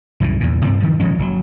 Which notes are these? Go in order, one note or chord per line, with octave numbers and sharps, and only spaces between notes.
C2 F#2 A2 E3
E2 A#2
G2 C3 C4
D#3 F3
D#1 F3 G#3 C#4
F#1 C#3 F#3